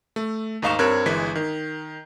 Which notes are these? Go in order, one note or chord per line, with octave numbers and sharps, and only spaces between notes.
A3
D#2 G#2 D#4 F5 C#6 E7
G2 C4 A#4 C#5 F#6 G#6
G1 E3 G#3 B6
D#3